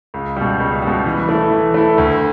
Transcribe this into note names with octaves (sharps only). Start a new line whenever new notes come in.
C#2
B2 G3
C#2
G3
B2
E3
A3 E4
E3
A3 E4
D2